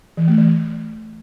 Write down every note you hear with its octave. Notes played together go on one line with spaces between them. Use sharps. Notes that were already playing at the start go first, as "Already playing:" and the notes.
E3
A3
E3